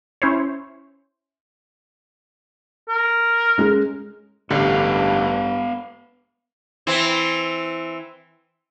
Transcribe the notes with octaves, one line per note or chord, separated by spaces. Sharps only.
C#4 E4 C5 C#5
A#4
G#3 C#4
A1 G2 D3 B3 G4 F5
E3 C4